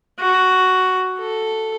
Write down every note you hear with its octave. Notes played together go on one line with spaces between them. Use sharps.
F#4
A4